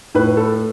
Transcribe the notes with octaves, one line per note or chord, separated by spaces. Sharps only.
A2 B4
A4